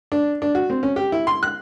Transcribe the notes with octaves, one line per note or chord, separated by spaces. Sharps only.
D4
D4
F#4
C4
C#4
G4
E4
C6
F#6